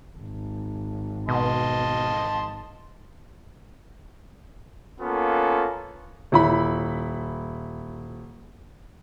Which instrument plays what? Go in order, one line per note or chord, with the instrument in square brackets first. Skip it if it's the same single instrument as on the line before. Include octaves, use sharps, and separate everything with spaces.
[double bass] G#1
[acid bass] B2 [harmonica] D#5 A5 C6
[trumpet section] A#3 B3 C#4 F4 A4
[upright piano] D#1 E4 B5